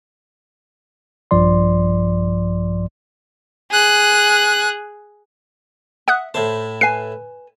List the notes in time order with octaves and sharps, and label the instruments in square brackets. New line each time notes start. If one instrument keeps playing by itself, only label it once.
[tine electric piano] A#1 G2 F3 D5 C6
[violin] G#4 F#6
[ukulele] E5 [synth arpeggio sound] F#5 D#6 F#6
[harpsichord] A2 E4 A5 [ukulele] C5
[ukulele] B4 G#5 [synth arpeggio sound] C7